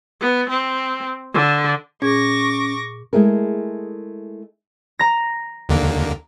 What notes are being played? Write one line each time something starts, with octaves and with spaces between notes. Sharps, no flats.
B3
C4
D3
A#2 C#4 G#4 C#6 D6 G#6 A#6
G#3 A3 E4 G#4 A#4
A#5 A#6
D#2 D3 A#3